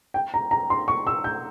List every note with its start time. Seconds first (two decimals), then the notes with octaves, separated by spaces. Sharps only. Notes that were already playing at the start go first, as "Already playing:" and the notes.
0.14 G5
0.34 A#5
0.51 A#5
0.70 C6
0.88 C#6
1.07 E6
1.24 G6